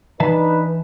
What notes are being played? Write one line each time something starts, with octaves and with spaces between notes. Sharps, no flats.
E3 D4 D#4 B4 E5 A5